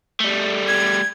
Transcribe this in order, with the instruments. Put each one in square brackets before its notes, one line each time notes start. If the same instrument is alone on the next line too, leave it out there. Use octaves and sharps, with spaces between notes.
[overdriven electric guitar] G3 A3
[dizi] G#6